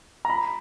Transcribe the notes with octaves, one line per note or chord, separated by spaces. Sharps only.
A#5
B5